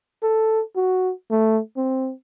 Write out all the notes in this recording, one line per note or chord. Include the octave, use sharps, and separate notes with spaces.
A4
F#4
A3
C4